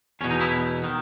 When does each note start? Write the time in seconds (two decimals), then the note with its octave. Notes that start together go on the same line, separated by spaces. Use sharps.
0.21 E2 C#4
0.24 B2
0.31 D#4
0.41 E4
0.84 D#3